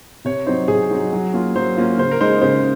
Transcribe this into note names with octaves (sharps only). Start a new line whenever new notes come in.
C3 C#5
F#3 C4 D#4 C5
C3 G#4
F#3 C4 D#4
F#3
A#3 C#4 F4
F#3 C5
A#3 C#4 F4
C#3 C5
A#4
G#3 D#4 C5
C#3 C5